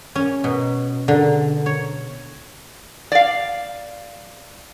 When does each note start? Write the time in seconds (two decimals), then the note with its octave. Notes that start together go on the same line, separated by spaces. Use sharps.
0.15 C#4
0.44 B2
1.08 D3
1.66 C#5
3.12 D5 F5